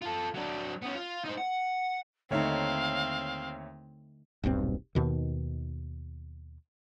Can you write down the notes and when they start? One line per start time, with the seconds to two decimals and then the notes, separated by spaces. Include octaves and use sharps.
0.02 F4 A4
0.35 F#3 D4
0.82 B3 C#4
0.95 F4
1.24 D#4 C5
1.37 F#5
2.31 D#2 D3 A3 C4 D#4 C#5 E5 F5
4.43 D#1 B1 G2 C4
4.95 D#2 B2 D#3